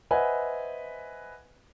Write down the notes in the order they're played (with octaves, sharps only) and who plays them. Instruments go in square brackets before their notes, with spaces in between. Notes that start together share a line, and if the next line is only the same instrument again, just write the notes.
[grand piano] B4 C5 D#5 E5 F#5 G#5